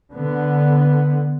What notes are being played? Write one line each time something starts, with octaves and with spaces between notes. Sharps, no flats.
D3 B3